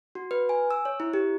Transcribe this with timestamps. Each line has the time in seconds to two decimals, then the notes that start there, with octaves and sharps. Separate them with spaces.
0.15 F#4
0.31 B4
0.49 G#5
0.71 E6
0.85 C#5
1.00 E4
1.13 G4